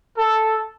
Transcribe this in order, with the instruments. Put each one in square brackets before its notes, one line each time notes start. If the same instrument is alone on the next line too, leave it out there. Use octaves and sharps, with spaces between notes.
[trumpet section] A4